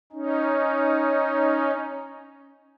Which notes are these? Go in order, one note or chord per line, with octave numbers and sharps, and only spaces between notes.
C#4 D#4